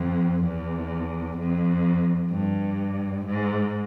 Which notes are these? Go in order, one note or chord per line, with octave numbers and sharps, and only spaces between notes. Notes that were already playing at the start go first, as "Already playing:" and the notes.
Already playing: F2
E2
F2
G2
G#2